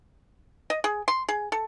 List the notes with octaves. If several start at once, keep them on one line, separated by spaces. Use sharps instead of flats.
D#5
G#4
C6
G#4
A4